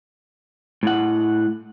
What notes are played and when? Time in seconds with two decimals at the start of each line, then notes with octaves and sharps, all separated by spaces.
0.83 A2 F#5